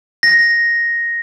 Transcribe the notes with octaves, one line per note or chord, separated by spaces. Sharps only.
A#6